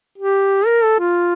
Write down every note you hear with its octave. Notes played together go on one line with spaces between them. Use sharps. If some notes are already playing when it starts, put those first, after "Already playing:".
G4
A#4
A4
F4